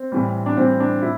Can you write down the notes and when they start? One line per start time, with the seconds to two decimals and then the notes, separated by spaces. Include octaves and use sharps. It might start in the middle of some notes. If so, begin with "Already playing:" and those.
Already playing: C4
0.12 A2 E3 G3
0.46 D4
0.57 A2 E3 G3 C4
0.80 D4
1.01 A2 E4